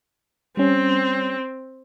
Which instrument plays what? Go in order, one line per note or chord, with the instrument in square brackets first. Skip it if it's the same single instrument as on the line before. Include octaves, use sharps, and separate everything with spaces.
[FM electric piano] G3 C#4 [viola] C4